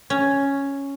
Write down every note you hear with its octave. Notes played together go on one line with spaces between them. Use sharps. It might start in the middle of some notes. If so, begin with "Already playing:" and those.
C#4